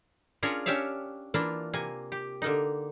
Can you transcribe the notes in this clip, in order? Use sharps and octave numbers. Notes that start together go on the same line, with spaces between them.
C#4 D4 F4 G#4 A#4 C#5
C#4 D4 G4 C#5 E5 F5
E3 A#3 D4 F4
C3 A#3 G#5
G4
D3 A#3 D#4